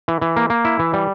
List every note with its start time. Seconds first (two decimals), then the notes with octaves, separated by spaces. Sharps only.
0.08 E3
0.21 E3
0.36 A#3
0.50 A#3
0.65 E4
0.79 E3
0.93 G3